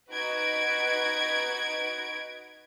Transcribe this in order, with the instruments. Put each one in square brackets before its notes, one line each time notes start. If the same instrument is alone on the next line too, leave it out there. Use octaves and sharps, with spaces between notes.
[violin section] D#4 F#4 B4 G#6 D7